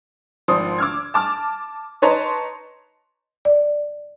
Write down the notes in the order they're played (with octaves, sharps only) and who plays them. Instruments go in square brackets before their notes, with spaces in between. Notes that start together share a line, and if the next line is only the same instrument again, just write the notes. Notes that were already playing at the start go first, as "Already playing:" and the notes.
[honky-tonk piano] G#1 F3 C6 D#6
D6 E6 F6 G#6
A5 D6 F6
D#4 B4 C#5 A5 A#5 C6
[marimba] D5